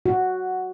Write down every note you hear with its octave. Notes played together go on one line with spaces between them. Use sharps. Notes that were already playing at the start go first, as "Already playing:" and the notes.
F#4